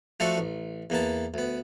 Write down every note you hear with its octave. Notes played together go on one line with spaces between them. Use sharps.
F3 A3 D4 F#4 A4
A1
E2 A#3 B3 A5
D2 B3